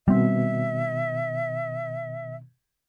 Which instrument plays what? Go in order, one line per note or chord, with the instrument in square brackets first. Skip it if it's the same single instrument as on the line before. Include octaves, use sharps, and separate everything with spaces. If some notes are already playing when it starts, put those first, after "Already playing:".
[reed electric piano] B2 D#3 [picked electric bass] G3 C4 [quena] E5